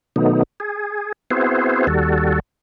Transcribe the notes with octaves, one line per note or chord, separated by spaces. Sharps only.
B2 D#3 F#3 A3 B3 D#4
G#4
B3 C4 E4 F#4 G#4 C5
D#2 G3 F#4 A4